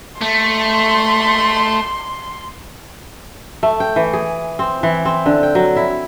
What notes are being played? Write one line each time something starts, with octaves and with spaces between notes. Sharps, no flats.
A3 C6
A3
G5
E3
G#4
C4
E3
C4
D3
G5
F#3
E4